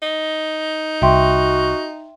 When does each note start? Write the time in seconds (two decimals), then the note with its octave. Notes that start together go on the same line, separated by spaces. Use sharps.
0.02 D#4
1.02 C2 F#4 E5 G5 C6